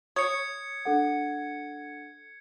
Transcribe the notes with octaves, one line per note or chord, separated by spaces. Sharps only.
C#5 D#6 G#6 C#7
D4 A4 F#5